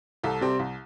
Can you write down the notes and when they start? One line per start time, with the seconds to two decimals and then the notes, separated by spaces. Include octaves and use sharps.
0.23 C2 A4
0.41 C3 G3 C4
0.59 C2